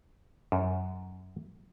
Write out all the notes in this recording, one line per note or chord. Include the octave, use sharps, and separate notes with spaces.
F#2